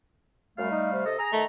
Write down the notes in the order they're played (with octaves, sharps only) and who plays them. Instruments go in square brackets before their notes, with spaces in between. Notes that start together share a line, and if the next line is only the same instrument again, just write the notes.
[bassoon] F#2 [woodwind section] G3 A3 F5
[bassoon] D#4
C3
[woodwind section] A4 D#5
[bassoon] G#4 [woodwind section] A#5
[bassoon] D#3 [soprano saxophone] A3